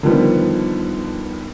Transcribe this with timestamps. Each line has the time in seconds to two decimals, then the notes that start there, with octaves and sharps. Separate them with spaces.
0.03 D3 D#3 F3 G3 B3